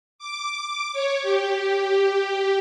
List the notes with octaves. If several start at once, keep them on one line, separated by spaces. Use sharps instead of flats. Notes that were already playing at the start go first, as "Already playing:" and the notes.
D6
C#5
G4